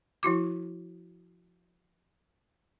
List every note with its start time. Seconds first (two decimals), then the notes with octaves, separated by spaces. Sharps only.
0.23 F3 E4 F#4 D6